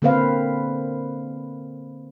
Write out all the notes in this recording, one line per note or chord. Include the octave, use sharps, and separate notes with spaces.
D3 A#3 C4 B4 C5 F5